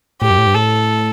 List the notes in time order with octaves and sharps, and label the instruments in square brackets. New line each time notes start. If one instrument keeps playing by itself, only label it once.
[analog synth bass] A2 [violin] G4
[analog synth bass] F#2
A2
G2
[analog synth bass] A2 [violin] A4